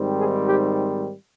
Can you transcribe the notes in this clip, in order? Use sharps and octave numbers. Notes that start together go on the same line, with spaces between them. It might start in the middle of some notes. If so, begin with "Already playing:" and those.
Already playing: G#2 D#3 G3 C4
G#4
G4